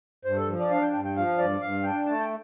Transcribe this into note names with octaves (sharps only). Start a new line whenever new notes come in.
G2 C5
A4
F3
D5
D4 F5
G5
G2 G5
G5
F3 F5
G2 D5
G2 F5
D4 G5
A3 A5
G5